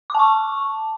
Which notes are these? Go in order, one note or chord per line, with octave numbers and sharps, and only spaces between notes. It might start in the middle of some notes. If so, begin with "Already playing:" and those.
A5 C#6 D6